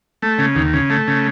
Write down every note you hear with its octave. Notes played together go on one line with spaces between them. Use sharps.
A3
C#3
D#2
C#3
A3
C#3